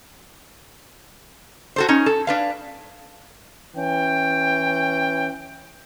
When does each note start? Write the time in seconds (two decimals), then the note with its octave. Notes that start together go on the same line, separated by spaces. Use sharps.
1.76 F#4 A4 C5
1.89 C#4 D#4
2.06 A4
2.27 D4 B4 F5
3.77 E3 C#4 G5